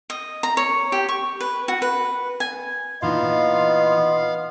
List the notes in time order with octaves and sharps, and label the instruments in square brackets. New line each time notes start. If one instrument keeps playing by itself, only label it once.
[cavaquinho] D#5
A#5
C#5
G4
C#6
B4
F#4
B4
G#5
[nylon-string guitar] A#2 E3 D#4 [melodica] B3 F5 [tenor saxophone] F4 [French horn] D#5